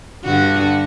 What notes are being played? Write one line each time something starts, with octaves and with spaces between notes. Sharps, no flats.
G2 D3 F#4